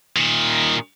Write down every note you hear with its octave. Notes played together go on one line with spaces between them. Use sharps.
A#2 D#3